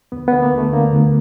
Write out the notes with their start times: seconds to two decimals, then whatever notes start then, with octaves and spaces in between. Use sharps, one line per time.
0.12 D2 B3
0.28 B3
0.33 D3
0.42 A#3
0.53 D2 A3
0.73 D3 A#3
0.93 D2